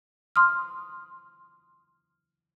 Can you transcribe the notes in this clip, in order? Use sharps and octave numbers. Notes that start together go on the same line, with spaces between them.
C6 D#6 F6